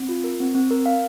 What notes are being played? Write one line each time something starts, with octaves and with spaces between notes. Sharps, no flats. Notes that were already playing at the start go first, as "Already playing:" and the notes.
Already playing: C4
F4
A#4
C4
C4
A#4
F5